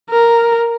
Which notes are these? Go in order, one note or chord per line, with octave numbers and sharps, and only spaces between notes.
A#4